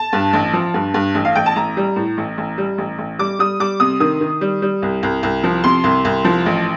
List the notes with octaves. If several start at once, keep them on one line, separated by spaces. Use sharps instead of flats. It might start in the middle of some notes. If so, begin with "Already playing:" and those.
Already playing: A5
G2
A1
F3
G2
G2
A1
F5
A1 G5
A5
A1 A#5
G3
A2
A1
A1
G3
A1
A1
G3 D6
G3 D#6
G3 D6
C3 D#6
D#3 D#6
D#3
G3
G3
C2
C2
C2
F3
C3 C6
C2
C2
F3
A1